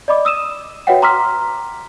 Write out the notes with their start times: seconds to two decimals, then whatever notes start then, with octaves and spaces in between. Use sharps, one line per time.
0.08 D5 D#5 B5 D6
0.25 D#6 E6 D#7 E7
0.87 F#4 B4 C#5 E5 F#5 G5
1.02 A#5 C6 D6 E6 F6 B6